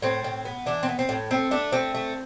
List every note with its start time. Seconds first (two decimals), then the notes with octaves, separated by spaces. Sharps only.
0.02 A2 C4
0.24 A2
0.45 B3
0.66 E3 D4
0.83 C4
0.89 B3
0.99 C4
1.09 A2
1.31 A3 C4
1.51 A3 D4
1.72 A3 C4
1.95 A3